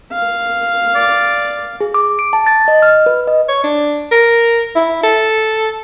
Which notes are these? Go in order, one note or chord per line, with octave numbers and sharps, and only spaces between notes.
F5
D5
G#4
D6
D7
A5
A6
D#5
F6
B4
D#5
C#5
D4
A#4
E4
A4